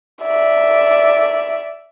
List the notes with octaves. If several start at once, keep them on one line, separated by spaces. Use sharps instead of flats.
D5 E5